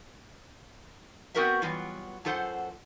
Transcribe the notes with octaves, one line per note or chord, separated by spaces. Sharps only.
B3 C4 F#4 A#4 B4 E5
E3 F#3 G3 B3 F4
F#2 F4 A4 C5 F#5